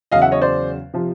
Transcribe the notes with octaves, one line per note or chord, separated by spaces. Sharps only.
E2 C#3 F#3 D#5 F5
E5 F#5
C#5 D#5
C5 D5
C3 F3